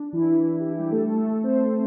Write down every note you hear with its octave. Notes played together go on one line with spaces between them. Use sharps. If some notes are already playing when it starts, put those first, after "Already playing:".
Already playing: D4
E3 E4
E3 E4
D4
G4
E3 E4
G3 G4
A3 A4
A3 A4
C4 C5